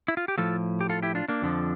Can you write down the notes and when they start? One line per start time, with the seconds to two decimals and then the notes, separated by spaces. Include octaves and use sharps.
0.08 E4
0.17 F4
0.28 G4
0.38 A2 F3 F4 A4
0.81 G4
0.89 F4 A4
1.03 E4 G4
1.15 D4 F4
1.28 A#3 D4
1.42 F2 D3 F3